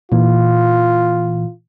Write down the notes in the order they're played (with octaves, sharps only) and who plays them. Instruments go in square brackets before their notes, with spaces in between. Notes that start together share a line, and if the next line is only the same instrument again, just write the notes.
[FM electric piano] A#2 E3 [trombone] F4